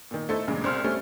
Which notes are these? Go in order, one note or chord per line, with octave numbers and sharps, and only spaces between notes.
A#2 D#3
A3 D#4 E4 A4 C5
E2 G2 A#2 C#3 G#3
C2 C4 C6 F6
G3 A3 C4 C#4